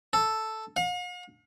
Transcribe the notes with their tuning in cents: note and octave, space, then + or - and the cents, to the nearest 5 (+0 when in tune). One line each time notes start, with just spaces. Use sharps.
A4 +0
F5 +45